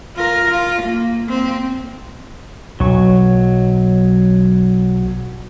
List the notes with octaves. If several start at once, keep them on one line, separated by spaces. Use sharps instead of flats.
F4 A#4
F4
A#3
A#3 C4
B1 F#3 C#6